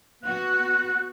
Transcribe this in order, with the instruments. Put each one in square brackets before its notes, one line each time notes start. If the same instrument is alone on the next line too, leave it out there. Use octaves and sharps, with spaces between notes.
[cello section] B3 F#4 [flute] F#6